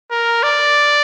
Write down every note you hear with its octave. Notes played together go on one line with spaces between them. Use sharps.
A#4
D5